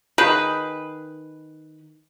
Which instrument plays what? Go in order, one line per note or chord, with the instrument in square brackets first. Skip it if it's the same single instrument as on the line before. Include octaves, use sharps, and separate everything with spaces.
[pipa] D#3 G#4 B4 B5